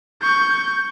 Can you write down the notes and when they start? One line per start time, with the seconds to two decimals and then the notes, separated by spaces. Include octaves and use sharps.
0.22 C#6 G6